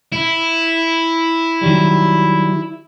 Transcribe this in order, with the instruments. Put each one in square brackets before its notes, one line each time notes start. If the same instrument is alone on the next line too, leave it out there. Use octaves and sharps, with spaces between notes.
[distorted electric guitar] E4
[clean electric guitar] D#3 F#3 G3